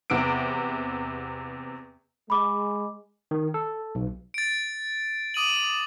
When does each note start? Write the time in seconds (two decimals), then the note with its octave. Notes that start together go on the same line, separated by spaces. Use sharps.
0.10 E2 C3 B3 E6 D7
2.30 G#3 B5 D6
3.31 D#3
3.54 A4
3.95 B1
4.34 A6 D7
5.34 D6 D#6 D#7 F#7